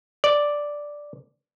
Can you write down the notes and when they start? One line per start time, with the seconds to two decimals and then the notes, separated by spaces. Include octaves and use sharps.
0.24 D5